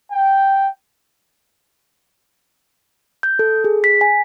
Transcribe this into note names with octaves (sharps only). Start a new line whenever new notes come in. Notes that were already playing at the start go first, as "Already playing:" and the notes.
G5
G6
A4
G#4
B6
G#5